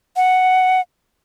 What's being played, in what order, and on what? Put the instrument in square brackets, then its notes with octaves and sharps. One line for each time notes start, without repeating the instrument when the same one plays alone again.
[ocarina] F#5